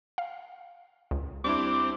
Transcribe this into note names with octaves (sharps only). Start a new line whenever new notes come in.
F5
C#2
G3 C4 D4 E4 D6